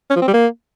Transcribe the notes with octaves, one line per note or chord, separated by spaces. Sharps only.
C#4
F3
C4
G3
A#3